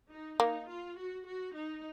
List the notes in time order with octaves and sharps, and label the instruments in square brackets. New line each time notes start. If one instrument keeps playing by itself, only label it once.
[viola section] D#4
[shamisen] A#3 [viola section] D#4
[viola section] F4
F#4
F#4
D#4